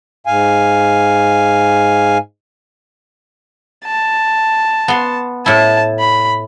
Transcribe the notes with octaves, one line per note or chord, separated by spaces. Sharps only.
G#2 F5 G#5
A5
B3 C6
A2 E4 A5
B5